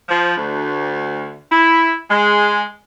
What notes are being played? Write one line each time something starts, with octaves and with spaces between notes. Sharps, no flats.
F3
D2
E4
G#3